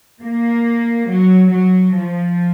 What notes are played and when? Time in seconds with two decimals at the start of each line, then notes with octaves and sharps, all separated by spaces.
0.23 A#3
1.09 F#3
1.52 F#3
1.95 F3